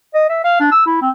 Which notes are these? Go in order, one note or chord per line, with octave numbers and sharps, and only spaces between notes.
D#5
E5
F5
D4
E6
E4
C4